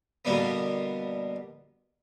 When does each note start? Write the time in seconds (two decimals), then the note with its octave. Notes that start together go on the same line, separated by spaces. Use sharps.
0.25 B2 D3 G3 A#3 B3